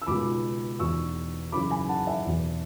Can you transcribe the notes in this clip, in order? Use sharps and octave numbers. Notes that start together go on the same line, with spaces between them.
E6
C#2 B2 B5 D6
E2 B2 C#6 E6
F#2 C#3 E3 B5 D6
G#5 B5
F#5 A5
E5 G#5
E2 B2